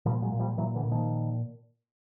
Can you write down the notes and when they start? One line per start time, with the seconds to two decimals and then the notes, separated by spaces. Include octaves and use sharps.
0.05 A#2 F3 G3
0.22 F#3 G#3
0.32 A#2
0.40 F3 G3
0.57 A#2 E3 F#3
0.75 D3 E3
0.83 A#2
0.91 D#3 F3